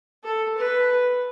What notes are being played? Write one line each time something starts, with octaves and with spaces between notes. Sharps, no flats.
A4
B4